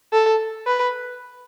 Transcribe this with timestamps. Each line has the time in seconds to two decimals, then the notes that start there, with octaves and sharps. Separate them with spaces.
0.13 A4
0.66 B4